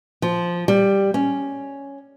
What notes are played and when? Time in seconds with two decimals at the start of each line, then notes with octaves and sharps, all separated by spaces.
0.22 F3
0.68 G3
1.14 C#4